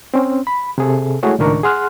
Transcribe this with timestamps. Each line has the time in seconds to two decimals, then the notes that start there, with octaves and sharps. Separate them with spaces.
0.14 C4 C#4
0.47 B5
0.78 C3 G#4 A4
1.23 G#3 A3 E4 F#4 G#4 C#5
1.38 C#2 A2 D#3 D4 A#4 C#6
1.63 G#4 F#5 C6 F6 F#6